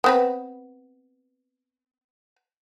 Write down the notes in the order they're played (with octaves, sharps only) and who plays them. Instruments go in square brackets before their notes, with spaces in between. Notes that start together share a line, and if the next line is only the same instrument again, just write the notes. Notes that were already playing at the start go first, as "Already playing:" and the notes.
[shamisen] B3 C4 B4